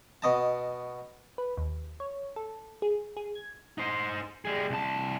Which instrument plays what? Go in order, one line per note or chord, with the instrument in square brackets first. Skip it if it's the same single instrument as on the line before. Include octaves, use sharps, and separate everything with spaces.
[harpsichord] B2 D#5 A5
[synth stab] B4
D#2
C#5
A4
G#4
G#4
G#6
[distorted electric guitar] D#4 C5
G3 G#4
C2 A5